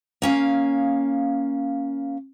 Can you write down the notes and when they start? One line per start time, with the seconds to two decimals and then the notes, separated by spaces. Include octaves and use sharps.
0.22 A#3 C#4 F5